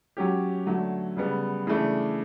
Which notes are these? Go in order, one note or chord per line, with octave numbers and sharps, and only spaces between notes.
F#3 C#4 G4
D3 F#3 A3
C#3 G3 B3
C#3 E3 A3 D4